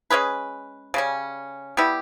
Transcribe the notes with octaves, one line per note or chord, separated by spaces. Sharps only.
G#3 C#4 G#4 B4
C#3 G3 C#4
G3 B3 E4 G4